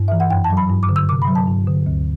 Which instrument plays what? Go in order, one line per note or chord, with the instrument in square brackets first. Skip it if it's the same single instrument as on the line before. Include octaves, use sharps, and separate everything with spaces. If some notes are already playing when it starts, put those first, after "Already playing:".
Already playing: [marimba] G2
E3 E5
F#5
F#2 G5
A5
F#3
B5
G2
D6
D3
E6
C3 D6
B5
F#3
A5
G2
D3
D2